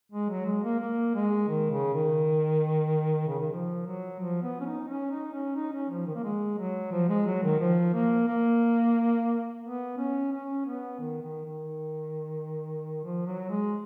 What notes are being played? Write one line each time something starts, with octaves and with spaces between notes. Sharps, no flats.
G#3
F#3
G#3
A#3
A#3
G#3
D#3
C#3
D#3
C#3
D#3
F3
F#3
F3
B3
C#4
D#4
C#4
D#4
C#4
D#4
C#4
F3
D#3
A#3
G#3
F#3
F3
G#3
F#3
D#3
F3
A#3
A#3
B3
C#4
C#4
B3
D#3
D#3
D#3
F3
F#3
G#3